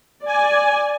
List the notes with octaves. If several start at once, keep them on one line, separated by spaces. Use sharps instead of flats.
D5 G#5